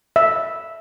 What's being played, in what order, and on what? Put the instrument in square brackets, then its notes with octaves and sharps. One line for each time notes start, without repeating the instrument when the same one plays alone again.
[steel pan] E5